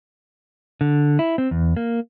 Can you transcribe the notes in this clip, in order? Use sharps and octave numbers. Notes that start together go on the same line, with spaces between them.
D3
E4
C4
E2
A#3